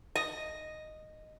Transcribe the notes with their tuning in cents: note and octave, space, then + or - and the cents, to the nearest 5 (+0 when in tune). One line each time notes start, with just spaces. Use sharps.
D#5 -5